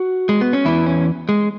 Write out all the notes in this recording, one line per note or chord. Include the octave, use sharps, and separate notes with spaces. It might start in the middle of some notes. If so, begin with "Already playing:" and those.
Already playing: F#4
G#3
B3
C#4
E2 E3 E4
C#4
G#3